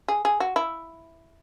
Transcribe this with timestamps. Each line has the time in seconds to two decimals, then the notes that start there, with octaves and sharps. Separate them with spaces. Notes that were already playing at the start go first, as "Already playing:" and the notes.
0.08 G#4
0.25 G#4
0.40 F#4
0.56 E4